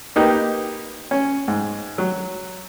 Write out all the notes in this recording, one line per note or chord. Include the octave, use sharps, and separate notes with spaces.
A#3 D#4 G4 B4
C#4
G#2
F#3